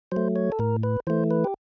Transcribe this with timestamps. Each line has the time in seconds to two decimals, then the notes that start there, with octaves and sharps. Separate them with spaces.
0.12 F#3 A3 C5
0.36 C#5
0.52 A4
0.59 A2 A#4
0.83 B4
1.07 E3 A3 C5
1.31 B4
1.44 G4